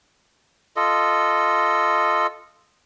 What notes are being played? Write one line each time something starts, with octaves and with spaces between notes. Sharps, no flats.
F4 A4 D#5